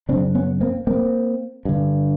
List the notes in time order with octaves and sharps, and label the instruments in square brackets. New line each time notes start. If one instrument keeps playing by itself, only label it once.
[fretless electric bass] F#2 C#3 C4 D4
B3 C#4
A#3 C4
A#3 C4
G2 D3